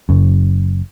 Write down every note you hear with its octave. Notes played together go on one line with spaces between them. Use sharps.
F#1 F#2